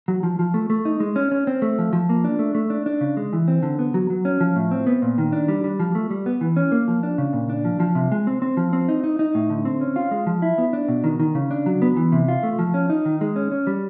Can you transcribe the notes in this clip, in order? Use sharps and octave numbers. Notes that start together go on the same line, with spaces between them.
F#3
F3
F3
A3
A3
D#4
G#3
C#4
C#4
C4
A3
F3
F3
A#3
D4
A3
A3
D4
D4
C#3
G#3
E3
C4
D3
B3
F#3
F#3
C#4
F3
A2
C4
B3
A#2
D#3
D4
G3
G3
F3
A3
G3
B3
E3
C#4
A#3
F3
D4
C#3
A#2
D4
F3
F3
C3
G#3
C4
C4
F3
C4
D#4
D#4
D#4
A2
D3
C4
C#4
F4
G#3
F3
E4
B3
D4
B2
D#3
D#3
C#3
D4
F#3
B3
E3
C3
F4
A3
F3
C#4
D#4
D#3
G#3
C#4
C#4
G3